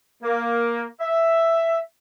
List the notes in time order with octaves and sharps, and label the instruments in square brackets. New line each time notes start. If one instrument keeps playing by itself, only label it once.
[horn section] A#3
E5